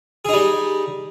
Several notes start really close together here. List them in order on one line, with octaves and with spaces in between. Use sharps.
G#4 D#4 G3